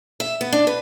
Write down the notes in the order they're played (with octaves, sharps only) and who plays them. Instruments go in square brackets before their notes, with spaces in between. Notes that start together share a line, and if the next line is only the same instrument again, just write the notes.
[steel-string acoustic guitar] E5
B3
D4
B4